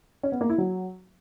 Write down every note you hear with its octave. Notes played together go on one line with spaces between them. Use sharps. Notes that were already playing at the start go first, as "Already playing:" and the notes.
C#4
B3
A#3
E4
F#3